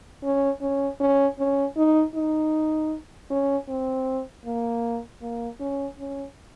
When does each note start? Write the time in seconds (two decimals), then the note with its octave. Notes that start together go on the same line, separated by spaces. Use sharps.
0.24 C#4
0.61 C#4
1.00 C#4
1.39 C#4
1.77 D#4
2.14 D#4
3.30 C#4
3.68 C4
4.45 A#3
5.22 A#3
5.60 C#4
5.99 C#4